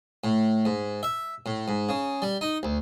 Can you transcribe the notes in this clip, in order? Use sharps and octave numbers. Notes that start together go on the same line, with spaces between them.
A2
G#2
E5
A2
G#2
C#3
G3
D#4
D2